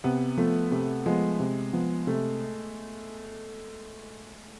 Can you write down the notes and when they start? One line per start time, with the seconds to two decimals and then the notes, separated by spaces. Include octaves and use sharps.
0.04 C3 B3
0.37 F3 A3 B3
0.71 C3 A3
1.06 F3 G#3 B3
1.40 C3
1.73 F3 B3
2.07 C3 A3